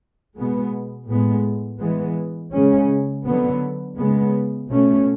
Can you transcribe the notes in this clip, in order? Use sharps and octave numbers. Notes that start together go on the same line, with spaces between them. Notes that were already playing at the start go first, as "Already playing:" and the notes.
B2 G#3 B3
A2 G#3 B3
E3 G#3 B3
C#3 G#3 C#4
D3 F#3 B3
C#3 G#3 B3
B2 A3 C#4